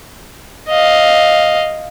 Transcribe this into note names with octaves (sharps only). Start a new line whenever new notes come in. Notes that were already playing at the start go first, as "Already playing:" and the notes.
D#5 F5